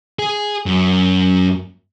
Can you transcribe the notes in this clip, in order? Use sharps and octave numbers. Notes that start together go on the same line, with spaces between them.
G#4
F#2